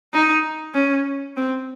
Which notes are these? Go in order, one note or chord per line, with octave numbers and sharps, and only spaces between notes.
D#4
C#4
C4